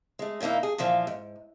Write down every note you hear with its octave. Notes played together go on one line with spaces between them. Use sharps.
G#3 A3
A#2 D#3 A#3 D#4 E4
G#4
A#2 E3 F3 A#3
G#2